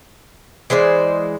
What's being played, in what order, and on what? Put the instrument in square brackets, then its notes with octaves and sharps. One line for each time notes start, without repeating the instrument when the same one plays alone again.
[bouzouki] E3 G#3 C5 D5